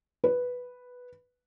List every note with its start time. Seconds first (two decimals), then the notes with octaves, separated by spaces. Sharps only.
0.24 B4